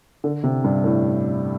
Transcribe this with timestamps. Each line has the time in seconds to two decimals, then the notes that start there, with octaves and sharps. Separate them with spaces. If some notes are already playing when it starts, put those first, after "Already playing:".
0.24 D3
0.43 C3
0.64 G2
0.84 A2